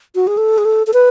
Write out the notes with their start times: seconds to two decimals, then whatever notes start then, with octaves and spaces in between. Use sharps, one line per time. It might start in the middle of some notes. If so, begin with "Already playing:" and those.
0.15 F#4
0.27 G#4
0.37 A4
0.58 G#4
0.65 A4
0.87 A4
0.94 B4